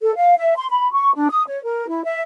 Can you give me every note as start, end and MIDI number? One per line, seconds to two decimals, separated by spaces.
0.01 0.14 69
0.16 0.34 77
0.37 0.54 76
0.57 0.68 84
0.70 0.91 83
0.92 1.14 85
1.15 1.27 62
1.30 1.43 87
1.47 1.61 73
1.64 1.87 70
1.89 2.03 64
2.04 2.20 76